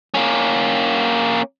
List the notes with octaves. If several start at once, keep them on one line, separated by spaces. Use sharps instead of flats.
A#3 C#4